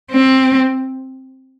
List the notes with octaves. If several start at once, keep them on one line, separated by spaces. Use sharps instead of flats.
C4